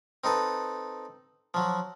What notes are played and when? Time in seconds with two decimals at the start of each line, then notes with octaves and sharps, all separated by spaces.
0.24 C4 D#4 A4 B4
1.54 F3 F#3